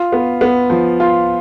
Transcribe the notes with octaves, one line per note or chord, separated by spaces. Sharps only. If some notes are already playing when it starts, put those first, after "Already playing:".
Already playing: F4
B3
B3
F3
F4